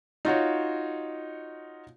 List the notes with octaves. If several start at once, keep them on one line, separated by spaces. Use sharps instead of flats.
D#4 F4 F#4 C#5